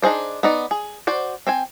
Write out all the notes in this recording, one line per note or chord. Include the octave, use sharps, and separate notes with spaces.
D4 D#4 G#4 C5 D5
B3 D#4 D5
G#4
F#4 C5 D5
C4 C5 G#5